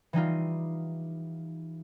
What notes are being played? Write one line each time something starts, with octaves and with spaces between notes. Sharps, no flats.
E3 G3 D#4 F4